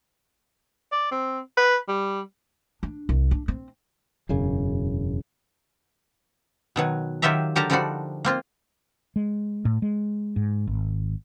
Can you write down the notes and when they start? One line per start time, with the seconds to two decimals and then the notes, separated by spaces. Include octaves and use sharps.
0.92 D5
1.11 C4
1.57 B4
1.88 G3
2.83 D4
3.09 C2
3.31 D4
3.48 C4
4.29 E1 F#2 C#3
6.76 B2 D#3 F#3
7.22 D#3 F#3 F4 G4 E5 A#5
7.56 D3 F#3 G4 A#4 A5 A#5
7.70 D3 F3 G3 D4 D#4 F#4
8.25 A#3 C4 F4
9.16 G#3
9.65 A2
9.82 G#3
10.36 G#2
10.67 G#1